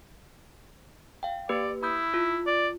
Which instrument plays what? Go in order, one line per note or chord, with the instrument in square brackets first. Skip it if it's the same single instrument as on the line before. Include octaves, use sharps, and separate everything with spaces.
[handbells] F5 G5
[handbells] A#3 G4 B4 [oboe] D5
[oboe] E4 [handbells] B5 D#6 G6
[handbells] F4
[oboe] D5